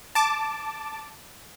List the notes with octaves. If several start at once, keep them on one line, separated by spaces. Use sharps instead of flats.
A5 D6